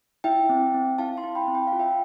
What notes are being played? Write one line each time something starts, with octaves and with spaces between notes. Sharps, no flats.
E4 E5 G5
C4
C4
E4 F5 A5
A5 C6
E4
G5 B5
C4
G5
F5
F4
E5 G5